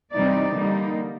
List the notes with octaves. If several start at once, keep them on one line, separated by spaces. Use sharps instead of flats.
C3 E3 G3 C4 D#4 D5
D3 G3 A#3 D#4